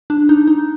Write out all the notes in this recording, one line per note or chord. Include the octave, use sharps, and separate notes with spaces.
D4
D#4
D#4